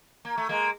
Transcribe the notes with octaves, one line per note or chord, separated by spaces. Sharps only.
A#3
A3
G#3 A#3